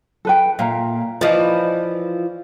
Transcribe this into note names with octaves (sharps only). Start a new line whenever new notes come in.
A4 B4 G5
A#2 E5 F5 A#5
E3 F3 D5 D#5 F5